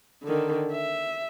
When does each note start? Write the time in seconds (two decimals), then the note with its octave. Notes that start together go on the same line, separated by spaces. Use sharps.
0.23 D3 D#3
0.72 E5